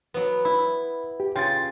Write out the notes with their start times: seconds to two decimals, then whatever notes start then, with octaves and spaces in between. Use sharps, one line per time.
0.14 F#3 B3
0.45 E4 B5
1.20 G4
1.36 C#3 F4 G5 A6